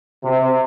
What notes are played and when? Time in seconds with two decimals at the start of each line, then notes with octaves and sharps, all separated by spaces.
0.24 C3